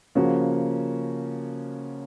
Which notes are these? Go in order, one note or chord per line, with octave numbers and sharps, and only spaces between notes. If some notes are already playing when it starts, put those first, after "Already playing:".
C#3 F3 A#3 C#4 F#4